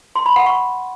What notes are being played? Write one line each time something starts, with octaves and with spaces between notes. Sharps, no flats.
C6
B5
F#5
C#6